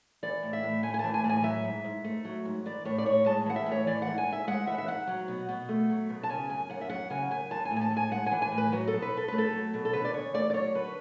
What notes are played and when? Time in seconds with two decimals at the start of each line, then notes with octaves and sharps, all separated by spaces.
0.23 E3 D5
0.43 A2
0.53 E5
0.63 A2
0.83 A3 G#5
0.94 G#5
0.99 E3 A5
1.14 G#5
1.24 A2 A5
1.29 G#5
1.43 F#3 E5
1.64 G#2
1.84 G#2
2.04 A3
2.25 F#3
2.45 G#2
2.66 E3 D5
2.85 A2 C#5
2.98 D5
3.06 A2 C#5
3.26 G#3 A5
3.46 E3 F#5
3.56 E5
3.66 A2
3.72 C#5
3.87 E3 D5
4.02 F#5
4.08 G#2
4.18 G#5
4.27 G#2
4.32 E5
4.47 G#3 F#5
4.67 E3 E5
4.78 E5
4.87 G#2 F#5
5.07 F#3
5.28 B2
5.49 B2
5.69 A3
5.90 F#3
6.09 B2
6.23 A5
6.29 C#3 G#5
6.49 F#2 G#5
6.70 F#2 F#5
6.81 E5
6.90 F#3 F#5
7.10 C#3 G#5
7.31 F#2 G#5
7.50 E3 A5
7.65 G#5
7.71 A2
7.77 G#5
7.81 A5
7.91 A2
7.97 G#5
8.11 G#3 F#5
8.26 G#5
8.32 E3
8.42 G#5
8.52 A2
8.58 B4
8.72 F#3 F#4
8.87 A4
8.93 B2
9.02 B4
9.12 B2
9.17 A4
9.28 A3 B4
9.38 A4
9.53 F#3
9.74 B2
9.85 A4
9.93 D3 B4
10.05 D5
10.13 E2 C#5
10.34 A3 D5
10.50 D5
10.53 F#3 C#5
10.75 D3 B4